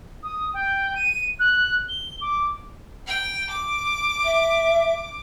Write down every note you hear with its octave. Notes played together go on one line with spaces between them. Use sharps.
D#6
G5
D#7
F#6
G7
D6
G5
D6
E5